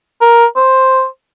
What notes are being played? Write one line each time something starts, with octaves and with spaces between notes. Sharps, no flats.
A#4
C5